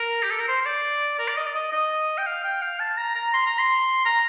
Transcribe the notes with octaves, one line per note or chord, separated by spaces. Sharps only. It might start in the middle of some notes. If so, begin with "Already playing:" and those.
Already playing: A#4
G4
A4
A#4
C5
C5
D5
A#4
D5
D#5
D5
D#5
D#5
G5
F5
G5
F5
A5
A#5
A#5
C6
A#5
C6
A#5